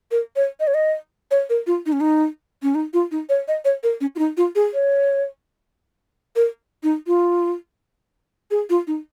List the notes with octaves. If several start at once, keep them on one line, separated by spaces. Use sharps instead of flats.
A#4
C#5
D#5
C#5
D#5
C#5
A#4
F4
D#4
C#4
D#4
C#4
D#4
F4
D#4
C#5
D#5
C#5
A#4
C#4
F4
D#4
F4
G#4
C#5
A#4
D#4
F4
G#4
F4
D#4